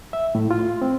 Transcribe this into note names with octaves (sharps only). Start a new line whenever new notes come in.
E5
A2
F4
C4